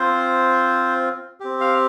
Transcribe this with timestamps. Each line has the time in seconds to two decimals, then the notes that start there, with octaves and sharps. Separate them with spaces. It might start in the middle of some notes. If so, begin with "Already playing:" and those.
Already playing: C4 F4 C5
1.40 C4 G4
1.60 F5